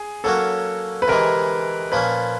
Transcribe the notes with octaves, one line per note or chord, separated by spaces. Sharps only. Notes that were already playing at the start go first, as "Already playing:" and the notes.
Already playing: G#4
F#3 A#3 C#4 F#4 A4
B4
C3 E3 G#3 A#4
A#2 F3 A#3 C#4 B4